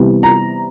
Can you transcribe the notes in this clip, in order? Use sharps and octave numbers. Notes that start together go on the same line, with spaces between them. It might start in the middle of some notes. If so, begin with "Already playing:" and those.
Already playing: C3 E3 G3 B3
A#5